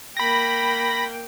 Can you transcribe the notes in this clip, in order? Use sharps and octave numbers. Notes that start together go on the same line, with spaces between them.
A#3 G5 B5 A#6